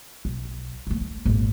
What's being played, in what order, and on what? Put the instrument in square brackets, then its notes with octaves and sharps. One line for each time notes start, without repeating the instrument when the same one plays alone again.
[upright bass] B1
D3 A3
A3
G#1 A#2